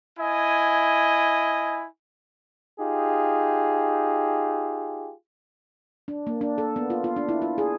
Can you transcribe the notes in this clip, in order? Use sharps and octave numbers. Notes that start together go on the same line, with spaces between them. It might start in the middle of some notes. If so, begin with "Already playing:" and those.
E4 D#5 G#5
D#4 F4 G4 G#4
D4
A#3
D4
A4
B3
F4
F4
D4
E4
F4
G#4